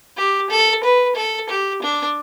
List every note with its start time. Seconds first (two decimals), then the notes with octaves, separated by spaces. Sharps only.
0.17 G4
0.50 A4
0.84 B4
1.16 A4
1.49 G4
1.82 D4